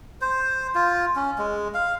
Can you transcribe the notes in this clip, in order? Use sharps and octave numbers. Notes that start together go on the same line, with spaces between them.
C5
F4
C#4
G#3
F5